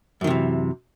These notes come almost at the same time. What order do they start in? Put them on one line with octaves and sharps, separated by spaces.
F#2 D#3 C3 E3